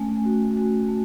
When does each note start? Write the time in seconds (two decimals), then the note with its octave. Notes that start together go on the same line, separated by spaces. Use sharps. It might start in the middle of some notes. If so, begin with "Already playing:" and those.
Already playing: A3 C#4 G#5
0.25 F#4
0.57 F#4
0.88 A3